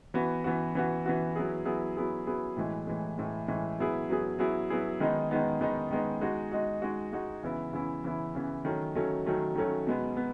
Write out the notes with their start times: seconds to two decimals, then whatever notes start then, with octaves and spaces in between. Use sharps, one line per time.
0.14 E3 B3 F#4
0.44 E3 B3 F#4
0.75 E3 B3 F#4
1.06 E3 B3 F#4
1.36 F#3 B3 E4 G#4
1.65 F#3 B3 E4 G#4
1.97 F#3 B3 E4 G#4
2.27 F#3 B3 E4 G#4
2.56 A2 E3 G#3
2.87 A2 E3 G#3
3.18 A2 E3 G#3
3.48 A2 E3 G#3
3.79 F#3 B3 E4 G#4
4.09 F#3 B3 E4 G#4
4.39 F#3 B3 E4 G#4
4.70 F#3 B3 E4 G#4
5.00 D#3 G#3 B3 D#4
5.30 D#3 G#3 B3 D#4
5.61 D#3 G#3 B3 D#4
5.91 D#3 G#3 B3 D#4
6.21 G#3 D#4 F#4
6.51 G#3 D#4 F#4
6.82 G#3 D#4 F#4
7.13 G#3 D#4 F#4
7.43 C#3 E3 B3 E4
7.73 C#3 E3 B3 E4
8.04 C#3 E3 B3 E4
8.35 C#3 E3 B3 E4
8.65 D#3 F#3 A3 C#4
8.95 D#3 F#3 A3 C#4
9.26 D#3 F#3 A3 C#4
9.56 D#3 F#3 A3 C#4
9.87 B2 G#3 B3
10.17 B3